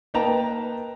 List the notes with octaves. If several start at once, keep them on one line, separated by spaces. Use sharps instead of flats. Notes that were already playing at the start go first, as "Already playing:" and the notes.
A#3 D#4 B4 G5 A5 A#5